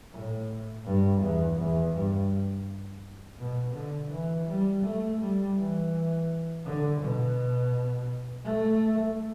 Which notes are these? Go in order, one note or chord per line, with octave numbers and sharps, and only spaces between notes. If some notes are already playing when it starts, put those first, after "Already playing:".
A2
G2
E2
E2
G2
B2
D3
E3
G3
A3
G3
E3
D3
B2
A3